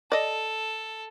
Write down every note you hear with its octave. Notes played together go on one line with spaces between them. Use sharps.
A4 D5 D#5